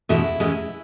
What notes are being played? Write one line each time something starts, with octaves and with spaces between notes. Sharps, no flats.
E2 B2 G#3 C#4 E4
E2 B2 G#3 C#4